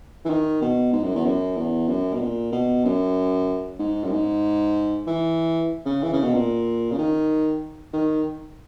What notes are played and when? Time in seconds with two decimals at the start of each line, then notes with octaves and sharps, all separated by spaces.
0.25 E3
0.29 D#3
0.62 B2
0.93 G#2
1.03 F#2
1.15 E2
1.25 F#2
1.57 E2
1.88 F#2
2.14 B2
2.20 A#2
2.52 B2
2.85 F#2
3.79 G#2
4.04 F#2
4.11 G#2
5.07 E3
5.86 C#3
6.03 E3
6.13 C#3
6.23 B2
6.34 A#2
6.92 C#3
6.98 D#3
7.93 D#3